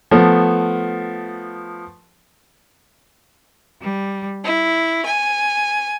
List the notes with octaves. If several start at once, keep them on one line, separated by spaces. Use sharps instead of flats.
F3 A3 B3
G3
E4
G#5